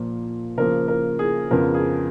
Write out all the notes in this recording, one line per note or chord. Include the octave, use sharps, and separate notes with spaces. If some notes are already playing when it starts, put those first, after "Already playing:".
Already playing: A#2 F3 A#3
C#3 F3 A#3 A#4
A#4
G#4
F2 C#3 F3 B3 A#4
G#4